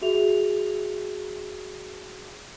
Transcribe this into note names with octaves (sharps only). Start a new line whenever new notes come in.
F#4 G#4 E5 F7